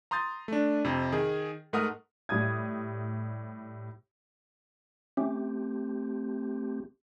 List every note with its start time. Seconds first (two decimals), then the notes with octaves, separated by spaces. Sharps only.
0.11 A#5 C6 D#6 G6 A6
0.48 A3 D4
0.84 F2 C3
1.12 D#3 G#4
1.73 G#2 A3 A#4 F#5 D#6 F6
2.29 A2 G3 D#6 G#6
5.17 A3 C4 C#4 G4